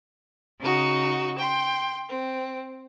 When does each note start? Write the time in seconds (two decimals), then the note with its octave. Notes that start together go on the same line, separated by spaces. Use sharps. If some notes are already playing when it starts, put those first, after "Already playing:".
0.60 C#3 D#4 F#4
1.37 G5 C6
2.08 C4